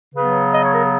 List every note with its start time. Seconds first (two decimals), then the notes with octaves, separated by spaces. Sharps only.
0.15 C#3 F#3 B3 B4
0.52 D#5
0.62 C#5
0.72 A#4
0.81 G#4